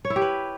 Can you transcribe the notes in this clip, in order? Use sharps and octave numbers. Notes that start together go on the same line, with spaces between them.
C#5
E4
G4
B4